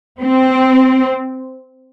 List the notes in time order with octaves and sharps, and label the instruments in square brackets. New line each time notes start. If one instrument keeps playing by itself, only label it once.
[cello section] C4